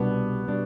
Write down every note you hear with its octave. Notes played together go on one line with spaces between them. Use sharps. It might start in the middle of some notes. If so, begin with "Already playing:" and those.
Already playing: C2 B2 G3 B3 D4
B2 G3 D4